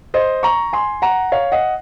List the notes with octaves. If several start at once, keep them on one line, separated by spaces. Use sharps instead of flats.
C5 D#5
A#5 C#6
G#5 C6
F#5 A#5
C#5 F5
D#5 F#5